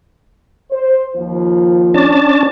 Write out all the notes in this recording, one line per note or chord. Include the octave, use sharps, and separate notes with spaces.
C5
D#2 F3 F4
C#4 D4 A5